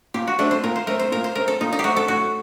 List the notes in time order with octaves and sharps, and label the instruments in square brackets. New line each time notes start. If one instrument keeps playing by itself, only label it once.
[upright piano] A#2 [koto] G4
[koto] F#4
[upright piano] A3 C4 [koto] D4
[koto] C5
[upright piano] A#2 [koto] A#4
[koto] C5
[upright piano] A3 C4 [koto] A#4
[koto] C5
[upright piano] A#2 [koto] A#4
[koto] C5
[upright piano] A3 C4 [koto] A#4
[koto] A4
[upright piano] A#2 [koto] D#4
[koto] D#4
G4
[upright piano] A3 C4 [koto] F#4
[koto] A4
[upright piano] A2 [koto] F#4